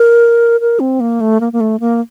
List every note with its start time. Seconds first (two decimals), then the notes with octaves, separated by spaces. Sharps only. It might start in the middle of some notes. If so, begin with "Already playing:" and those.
Already playing: A#4
0.61 A#4
0.80 C4
1.00 A#3
1.21 A3
1.40 A#3
1.53 A#3
1.60 A3
1.80 A#3